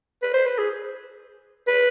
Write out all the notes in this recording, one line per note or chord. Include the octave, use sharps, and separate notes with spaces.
B4
C5
B4
G#4
B4